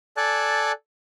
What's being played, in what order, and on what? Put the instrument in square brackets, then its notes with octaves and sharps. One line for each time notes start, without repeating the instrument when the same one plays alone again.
[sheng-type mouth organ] A4 D5 G#5 A5 F#6